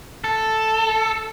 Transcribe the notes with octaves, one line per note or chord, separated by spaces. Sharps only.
A4